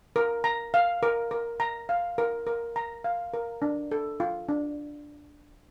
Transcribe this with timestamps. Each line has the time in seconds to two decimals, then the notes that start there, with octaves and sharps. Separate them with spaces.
0.16 A#4
0.44 A#5
0.74 F5
1.03 A#4
1.31 A#4
1.60 A#5
1.89 F5
2.18 A#4
2.47 A#4
2.76 A#5
3.04 F5
3.34 A#4
3.62 D4
3.91 A4
4.20 F4
4.49 D4